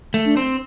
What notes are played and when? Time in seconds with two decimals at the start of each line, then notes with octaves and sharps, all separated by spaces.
0.14 A3
0.25 D4
0.37 C4